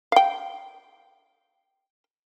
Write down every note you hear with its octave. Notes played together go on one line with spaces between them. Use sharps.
F5 G5